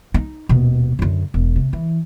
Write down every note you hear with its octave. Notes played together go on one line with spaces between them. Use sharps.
D#4
D#1 B2
F#2 D3
E1
C3
E3